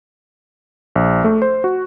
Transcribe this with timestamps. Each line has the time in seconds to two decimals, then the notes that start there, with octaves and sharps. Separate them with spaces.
0.95 A#1
1.24 A3
1.42 C5
1.64 F#4